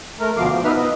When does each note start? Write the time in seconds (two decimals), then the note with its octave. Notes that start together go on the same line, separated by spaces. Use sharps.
0.20 A3 A#4
0.37 D2 B2 F3 F5 D6
0.51 F3
0.64 B3 D#4 B4 E5 F6
0.76 D#5